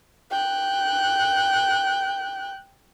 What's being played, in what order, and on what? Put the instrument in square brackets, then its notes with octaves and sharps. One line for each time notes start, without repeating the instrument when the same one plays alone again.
[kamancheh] G5 F#6